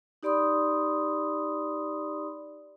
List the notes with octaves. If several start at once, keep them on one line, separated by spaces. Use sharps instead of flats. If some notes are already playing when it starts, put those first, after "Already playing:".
D#4 G4 D5 B5 C6 D#6